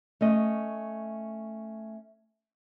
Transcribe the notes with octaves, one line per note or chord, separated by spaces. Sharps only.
A3 C#4 D#5